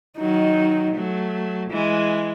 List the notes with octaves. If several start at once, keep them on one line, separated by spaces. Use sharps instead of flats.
D#3 F#3 D#4
F#3 A3
E3 G#3